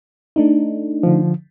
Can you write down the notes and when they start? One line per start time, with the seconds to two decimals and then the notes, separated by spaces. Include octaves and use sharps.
0.36 A3 D4 D#4
1.03 D3 F3